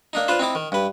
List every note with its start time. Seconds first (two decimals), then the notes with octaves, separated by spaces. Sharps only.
0.13 A#3 D4 D#4
0.28 D4 F4 B4 C5
0.39 C4 D#4 E4 D6
0.55 D#3
0.72 G2 B4